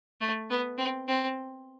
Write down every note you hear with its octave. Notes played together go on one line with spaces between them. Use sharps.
A3
B3
C4
C4